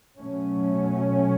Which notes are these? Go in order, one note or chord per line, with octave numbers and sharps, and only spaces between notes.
B2 F#3 A3 C#4